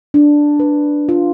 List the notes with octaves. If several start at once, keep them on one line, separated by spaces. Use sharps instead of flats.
D4
B4
F4